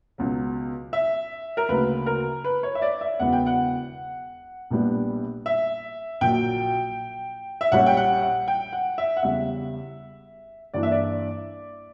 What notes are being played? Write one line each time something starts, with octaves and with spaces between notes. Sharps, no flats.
C#2 B2 F#3
E5
A#4
D2 C#3 F#3 A#3 B4
A#4
B4
C#5
E5
D5
E5
E1 E2 C#3 F#3 B3 F#5
G5
F#5
A#1 A#2 G3 B3 D4
E5
A#1 A#2 F#3 G5
E5
A#1 A#2 G3 C#4 F#5
G5
F#5
F#5
G5
F#5
E5
F#5
E2 C#3 G3 E5
G2 E3 A#3 D4 D5
E5
D5